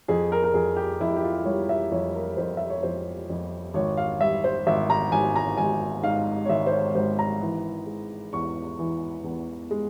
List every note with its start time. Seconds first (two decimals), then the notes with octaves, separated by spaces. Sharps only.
0.08 F2 G#4
0.32 A#4
0.44 A#4
0.54 F2 G#4
0.76 G4
1.00 F2 E4
1.16 G4
1.23 F4
1.45 G3 C#5
1.69 E5
1.91 F2 C#5
2.14 A#4
2.37 F2 C5
2.57 E5
2.70 C#5
2.83 F2 C5
3.30 F2
3.74 G#1 C#5
3.97 F5
4.20 G3 E5
4.44 C5
4.67 G#1 E5
4.90 A#5
5.12 G#1 G#5
5.36 A#5
5.57 G#1 G#5
6.03 G#2 F5
6.45 C#5
6.49 G#1 E5
6.67 C5
6.72 C#5
6.95 G#1 C5
7.19 A#5
7.41 E3
7.86 G#3
8.33 E2 C#6
8.79 E3
9.24 E2
9.71 G#3